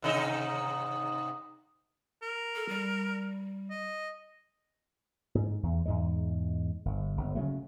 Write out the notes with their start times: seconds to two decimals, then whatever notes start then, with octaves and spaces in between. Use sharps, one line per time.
0.02 G#2 C3 D#4
2.22 A#4
2.56 A4
2.69 G3
3.70 D#5
5.35 G#2
5.63 E2
5.86 E2 G#2 G#3
6.85 G1
7.17 G1
7.35 C#3 F#3 A3